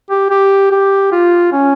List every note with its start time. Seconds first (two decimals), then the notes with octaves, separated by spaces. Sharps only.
0.10 G4
0.30 G4
0.71 G4
1.12 F4
1.52 C#4